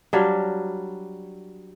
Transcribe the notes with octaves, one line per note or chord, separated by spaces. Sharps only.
F#3 G3 D4 F5